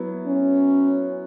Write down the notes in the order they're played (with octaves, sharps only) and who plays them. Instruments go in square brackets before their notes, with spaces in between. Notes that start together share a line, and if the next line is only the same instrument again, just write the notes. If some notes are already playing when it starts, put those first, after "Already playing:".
Already playing: [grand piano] F#3 B3 E4
[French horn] C#4